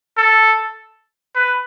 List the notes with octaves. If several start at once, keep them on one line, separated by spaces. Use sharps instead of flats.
A4
B4